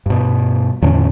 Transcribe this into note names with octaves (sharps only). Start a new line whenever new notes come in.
G2 B2
E2 A2 D3 C#4